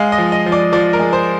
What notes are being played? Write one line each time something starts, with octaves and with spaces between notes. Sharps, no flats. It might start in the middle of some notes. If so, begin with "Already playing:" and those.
Already playing: G#3 F5
D#5
F3
D#5
F3
D5
F3 D5
A#4
G#3
C5